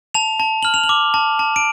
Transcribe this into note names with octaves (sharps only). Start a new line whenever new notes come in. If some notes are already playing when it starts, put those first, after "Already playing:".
A5 F7
A5
F6 F#7
F7
F#7
D6
A5
A5
D7